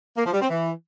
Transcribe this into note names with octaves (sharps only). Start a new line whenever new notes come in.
A#3
F3
G3
C4
E3